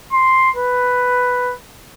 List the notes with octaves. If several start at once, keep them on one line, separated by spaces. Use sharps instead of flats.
C6
B4